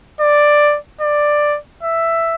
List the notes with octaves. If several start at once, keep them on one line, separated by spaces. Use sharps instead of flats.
D5
D5
E5